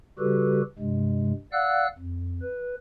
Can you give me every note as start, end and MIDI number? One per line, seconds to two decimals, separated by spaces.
0.19 0.62 49
0.19 0.62 55
0.19 0.62 66
0.19 0.62 67
0.19 0.62 69
0.19 0.62 71
0.79 1.33 43
0.79 1.33 48
0.79 1.33 56
1.52 1.87 74
1.52 1.87 77
1.52 1.87 78
1.52 1.87 88
1.52 1.87 90
1.98 2.40 41
2.42 2.75 71